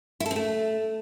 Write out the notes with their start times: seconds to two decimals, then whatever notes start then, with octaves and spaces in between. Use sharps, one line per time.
0.20 E4
0.26 A4
0.31 C4
0.36 A3